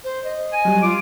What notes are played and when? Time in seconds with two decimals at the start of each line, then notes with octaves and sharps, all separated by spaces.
0.04 C5
0.24 D#5
0.53 G#5
0.65 F#3 G3
0.82 F4 D6